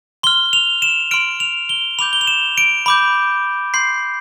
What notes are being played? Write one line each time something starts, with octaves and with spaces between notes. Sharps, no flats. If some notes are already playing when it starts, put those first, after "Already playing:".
C6 F6 G7
F7
E7
C6 F6 D7
F7
G7
B5 D6 G6 F7
G7
F7
E7
D7
B5 D6 G6
C6 G6 C7